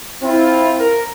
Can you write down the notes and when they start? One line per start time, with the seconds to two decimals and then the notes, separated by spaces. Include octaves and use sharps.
0.23 C4 E4 F4
0.80 A#4